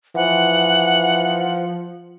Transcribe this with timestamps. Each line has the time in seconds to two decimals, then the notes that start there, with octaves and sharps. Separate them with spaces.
0.15 E3 F3 F#5